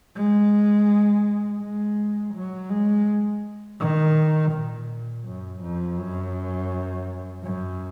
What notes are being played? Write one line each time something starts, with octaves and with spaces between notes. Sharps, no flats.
G#3
G#3
F#3
G#3
D#3
A#2
F#2
F2
F#2
F#2